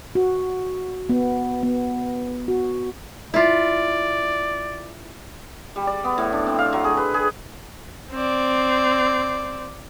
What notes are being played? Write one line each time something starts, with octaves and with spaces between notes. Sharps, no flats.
F#4
B3
B3
F#4
E4 F4 D5
G3
D5
B3
A2
D4
C4
F5
F#3
G#4
B4
G#4
C4 D5